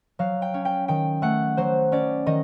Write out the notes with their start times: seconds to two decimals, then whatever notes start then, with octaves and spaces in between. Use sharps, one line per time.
0.19 F#3 F5
0.42 G5
0.54 C#4
0.65 G5
0.88 D#3 G5
1.22 A3 F#5
1.57 F#3 C5
1.92 C#4 D5
2.26 D#3 D#5